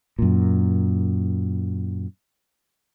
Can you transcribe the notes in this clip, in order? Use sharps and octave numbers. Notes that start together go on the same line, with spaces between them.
F#2 A#2